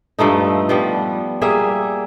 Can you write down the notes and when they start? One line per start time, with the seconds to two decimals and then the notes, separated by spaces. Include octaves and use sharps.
0.19 G2 F3 A3 D#4
0.69 F3 G3 B3
1.41 G3 A#3 G#4 E5